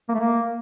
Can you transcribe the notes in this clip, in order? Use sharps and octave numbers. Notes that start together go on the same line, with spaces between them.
A#3
A3
A#3